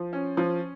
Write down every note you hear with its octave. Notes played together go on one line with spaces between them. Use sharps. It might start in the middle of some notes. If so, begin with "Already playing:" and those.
Already playing: F3
C#4
F3